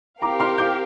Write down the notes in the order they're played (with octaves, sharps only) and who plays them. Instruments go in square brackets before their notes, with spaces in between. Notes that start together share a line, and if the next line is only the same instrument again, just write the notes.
[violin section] C4 G4 A#4 F5 [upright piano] A#5 D6
[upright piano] C6 F6
D6 G6